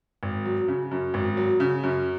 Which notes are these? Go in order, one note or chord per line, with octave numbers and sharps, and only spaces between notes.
G#1
F#3
C#3
F#2
G#1
F#3
C#3
F#2